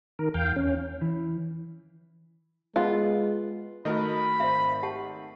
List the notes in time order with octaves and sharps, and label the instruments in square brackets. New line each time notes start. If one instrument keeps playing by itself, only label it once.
[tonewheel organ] D#3 A#4
E2 F5 G5
C#4
[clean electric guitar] E3
[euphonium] G#3 [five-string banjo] B3 F4
[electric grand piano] D#3 A3 [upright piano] F#4 A#4 D#5 [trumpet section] B5
[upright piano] G#1 C5 [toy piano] E5 F5
[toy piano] G4 F#5 A5